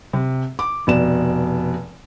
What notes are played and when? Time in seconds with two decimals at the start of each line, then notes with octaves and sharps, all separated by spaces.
0.13 C3
0.59 D6
0.87 F1 B2 D5 E7